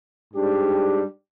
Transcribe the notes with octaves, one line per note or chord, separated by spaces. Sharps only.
G#2 G3 D4 G4